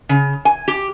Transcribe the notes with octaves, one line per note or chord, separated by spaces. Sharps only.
C#3
G#5
G4